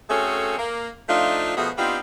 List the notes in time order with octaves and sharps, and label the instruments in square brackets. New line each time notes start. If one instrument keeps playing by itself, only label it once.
[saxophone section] A3 C4 C#4 F#4 G#4 A4
A#3
F3 A3 D4 D#4 F4
B2 F3 A3 B3 F#4 G#4
B3 C4 D4 D#4 F4 G4